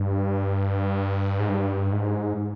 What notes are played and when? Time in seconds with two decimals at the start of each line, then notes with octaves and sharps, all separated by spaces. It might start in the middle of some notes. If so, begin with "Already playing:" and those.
Already playing: G2
1.39 G#2
1.49 G2
1.92 G#2